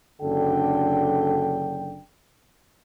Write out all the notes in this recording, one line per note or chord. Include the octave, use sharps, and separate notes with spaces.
F#1 F#2 D3 D4 A4 G5